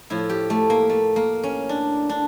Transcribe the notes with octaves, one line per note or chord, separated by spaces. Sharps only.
A2 F3 E4
G4
A3
A#3
A3
A#3
C#4
D4
D4